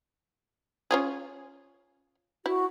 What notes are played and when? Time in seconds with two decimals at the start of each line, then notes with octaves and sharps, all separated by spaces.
0.91 C#4 F4 G#4
2.46 E4 F#4